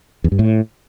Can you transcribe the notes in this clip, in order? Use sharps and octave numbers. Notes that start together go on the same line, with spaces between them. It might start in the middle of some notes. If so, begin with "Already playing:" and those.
E2
G2
A2